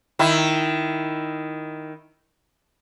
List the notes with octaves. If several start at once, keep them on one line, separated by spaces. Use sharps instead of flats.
D#3 E4